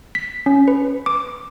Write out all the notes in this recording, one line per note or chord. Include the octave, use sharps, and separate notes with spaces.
B6
C#4
B4
D6